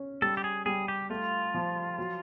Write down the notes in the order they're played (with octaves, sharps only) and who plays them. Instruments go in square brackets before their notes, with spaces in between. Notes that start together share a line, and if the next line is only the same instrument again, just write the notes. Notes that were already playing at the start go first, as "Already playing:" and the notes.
Already playing: [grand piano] C#4
[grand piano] G3 [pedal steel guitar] A4
[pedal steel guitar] G4
G#4
[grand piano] G3 [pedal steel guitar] G#4
[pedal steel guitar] G4
[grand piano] A3 [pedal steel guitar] F4
[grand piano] F3
F#3